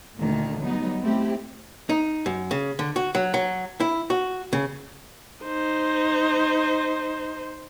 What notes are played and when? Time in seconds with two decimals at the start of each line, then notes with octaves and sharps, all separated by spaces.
0.16 D2 A#2 D3 D#3 A3
0.59 F#3 G3 B3 D#4
1.02 A3 C4 E4 G4
1.89 D#4
2.26 F#2
2.51 C#3
2.79 D3
2.96 F#4
3.15 F#3
3.34 F#3
3.80 E4
4.10 F#4
4.53 C#3
5.44 D#4 C5